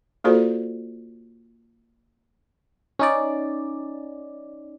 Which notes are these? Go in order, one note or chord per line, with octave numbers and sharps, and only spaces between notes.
A#3 F4 F#4 A4 C5 D5
C#4 D#4 D5